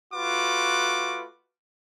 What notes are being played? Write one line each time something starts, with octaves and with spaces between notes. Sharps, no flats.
A3 F4 F#4 B4 D6